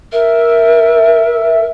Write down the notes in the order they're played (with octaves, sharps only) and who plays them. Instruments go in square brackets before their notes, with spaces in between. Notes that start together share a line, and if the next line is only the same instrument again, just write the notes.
[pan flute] A#4 [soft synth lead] E5